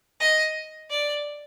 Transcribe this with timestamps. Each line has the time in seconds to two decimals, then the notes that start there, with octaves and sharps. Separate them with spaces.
0.20 D#5
0.90 D5